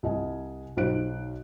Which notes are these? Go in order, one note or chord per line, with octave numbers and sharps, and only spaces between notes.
C2 D#5 G#5
B1 D#4 C5 F#6 D7